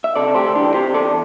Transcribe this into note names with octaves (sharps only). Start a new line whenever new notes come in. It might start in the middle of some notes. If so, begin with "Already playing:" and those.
E5
C3 A4 D5
D2 G4 C5
A4
E3 D4 G4
C3 G4 C5
E2 A4 D5